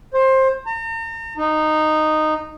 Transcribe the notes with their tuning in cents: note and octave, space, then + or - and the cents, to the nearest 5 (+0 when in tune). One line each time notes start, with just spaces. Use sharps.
C5 +20
A#5 -40
D#4 -10